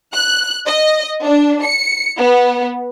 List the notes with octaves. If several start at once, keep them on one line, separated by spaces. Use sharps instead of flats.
F#6
D#5
D4
C#7
B3